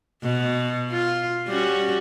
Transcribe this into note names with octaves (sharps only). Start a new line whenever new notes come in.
B2
F4
G3 C#4 F#4